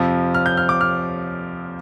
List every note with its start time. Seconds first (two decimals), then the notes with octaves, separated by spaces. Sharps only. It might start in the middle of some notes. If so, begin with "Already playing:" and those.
Already playing: F2 C3 F3
0.34 F6
0.46 G6
0.57 F6
0.69 D6
0.81 F6